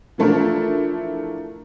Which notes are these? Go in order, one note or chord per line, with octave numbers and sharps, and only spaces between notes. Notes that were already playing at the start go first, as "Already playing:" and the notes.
E3 F3 A3 D4 E4 A#4